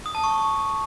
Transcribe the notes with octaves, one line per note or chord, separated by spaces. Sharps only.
D#6
A5
C#6